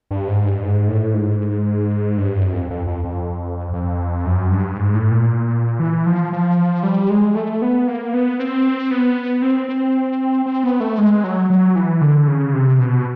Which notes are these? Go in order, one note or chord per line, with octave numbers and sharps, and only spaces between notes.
G2
G#2
G2
G#2
A2
G#2
G2
F#2
F2
F2
F2
F2
F2
F#2
G2
G#2
A2
A#2
E3
F3
F3
G3
G#3
A3
B3
A#3
B3
C4
B3
C4
C4
C4
B3
A3
G#3
F#3
F#3
E3
D3
C#3
C3
B2